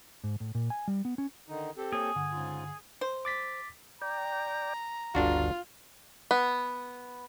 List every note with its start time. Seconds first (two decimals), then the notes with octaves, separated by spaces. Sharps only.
0.24 G#2
0.40 A2
0.55 A#2
0.70 G#5
0.88 G3
1.05 B3
1.18 C#4
1.49 D3 D#3 D#4
1.77 C4 G4 A4
1.93 A#3 G#4 C#5
2.16 G2 D3 F#5
2.32 G#2 C#3 F4
3.01 C5
3.25 D6 A6 B6
4.02 D5 G5 A#5
5.15 G1 D2 D4 F4 F#4
6.31 B3